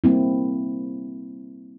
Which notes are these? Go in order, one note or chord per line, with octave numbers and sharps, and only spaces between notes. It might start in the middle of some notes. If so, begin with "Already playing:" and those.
G3 A#3 C4 E4